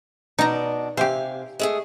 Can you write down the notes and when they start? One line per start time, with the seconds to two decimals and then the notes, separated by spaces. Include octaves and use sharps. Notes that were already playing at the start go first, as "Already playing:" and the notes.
0.39 B2 D4 D#4 A#5
0.97 C3 G4 C5 F5 G#5
1.59 G#3 A3 G#4